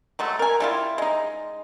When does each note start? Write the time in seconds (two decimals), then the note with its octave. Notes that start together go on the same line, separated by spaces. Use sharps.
0.19 F#3 G#3 A3
0.39 A#4 G#5
0.60 G3 E4 F4
0.98 G#3 D#4